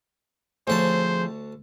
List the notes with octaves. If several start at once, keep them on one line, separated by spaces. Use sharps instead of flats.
D2 F3 C4 G#4 C5 C#5 A5